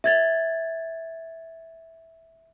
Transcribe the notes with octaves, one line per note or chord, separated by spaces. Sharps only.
E5 G#6 A6